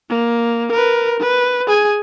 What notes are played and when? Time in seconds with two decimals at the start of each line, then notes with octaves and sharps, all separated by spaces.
0.10 A#3
0.73 A#4 B4
1.20 B4
1.67 G#4 G#5